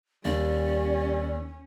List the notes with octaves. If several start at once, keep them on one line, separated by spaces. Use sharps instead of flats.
D#2 G3 C#4 D5